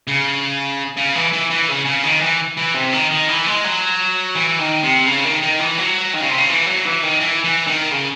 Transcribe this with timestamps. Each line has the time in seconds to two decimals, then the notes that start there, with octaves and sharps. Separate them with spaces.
0.07 C#3
0.97 C#3
1.15 E3
1.33 E3
1.50 E3
1.69 C#3
1.86 C#3
2.04 D#3
2.21 E3
2.57 E3
2.74 C3
2.93 D#3
3.11 D#3
3.29 E3
3.46 G#3
3.64 F#3
4.35 E3
4.59 D#3
4.83 C3
5.06 C#3
5.25 D#3
5.42 D#3
5.60 E3
5.78 F#3
6.14 D#3
6.21 C#3
6.29 C3
6.38 C#3
6.50 E3
6.66 F#3
6.85 E3
7.03 D#3
7.20 E3
7.45 E3
7.67 D#3
7.92 C#3